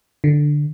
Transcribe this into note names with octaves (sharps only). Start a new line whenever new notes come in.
D3